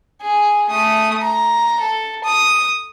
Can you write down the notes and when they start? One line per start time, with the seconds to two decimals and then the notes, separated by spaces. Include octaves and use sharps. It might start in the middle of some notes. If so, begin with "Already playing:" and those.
0.23 G#4
0.70 A3 D#6
1.22 A#5
1.80 A4
2.24 D#6